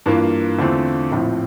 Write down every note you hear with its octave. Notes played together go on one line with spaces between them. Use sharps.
G2 E3 A#3 F4
E2 D3 A3 C4 F4
A#1 A2 F3 C4 F4